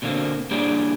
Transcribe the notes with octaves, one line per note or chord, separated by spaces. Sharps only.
B2 D3 F#3 A3 A#3 C4
G3 A#3 D4 G4 G#4 D5